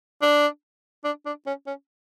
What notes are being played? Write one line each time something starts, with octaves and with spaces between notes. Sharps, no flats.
D4
D4
D4
C#4
C#4